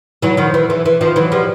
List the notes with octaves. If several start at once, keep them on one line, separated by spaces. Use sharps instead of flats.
E3 F#3
D#3 F3
E3
E3
E3
D#3 F3
E3 F#3
F3 G3